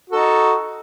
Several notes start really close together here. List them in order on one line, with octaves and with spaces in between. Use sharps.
F#4 A4 D#4